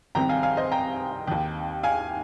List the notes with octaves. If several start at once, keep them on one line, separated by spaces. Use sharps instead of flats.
C2 C3 D#3 G5 A#5
F5 G#5
F5 G#5
C5 D#5
G5 A#5
D#2 D#3
F5 G#5